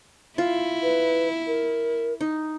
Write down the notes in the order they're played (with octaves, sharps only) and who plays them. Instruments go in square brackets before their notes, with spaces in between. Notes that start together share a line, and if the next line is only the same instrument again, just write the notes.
[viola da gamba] E4 [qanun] F4
[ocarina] B4
A#4
[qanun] D#4